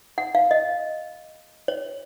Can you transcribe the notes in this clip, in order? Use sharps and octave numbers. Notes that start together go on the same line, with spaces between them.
F#5
F5
D#5
C#5